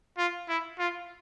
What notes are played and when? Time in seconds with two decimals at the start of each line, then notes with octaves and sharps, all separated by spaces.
0.18 F4
0.49 E4
0.79 F4